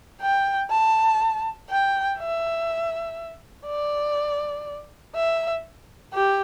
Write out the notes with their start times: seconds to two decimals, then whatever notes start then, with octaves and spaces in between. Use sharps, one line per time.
0.21 G5
0.71 A5
1.69 G5
2.18 E5
3.66 D5
5.15 E5
6.13 G4